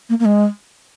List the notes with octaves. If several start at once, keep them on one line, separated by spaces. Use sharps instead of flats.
A#3
A#3
G#3